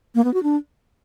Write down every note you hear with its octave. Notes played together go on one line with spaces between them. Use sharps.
A#3
B3
F#4
D4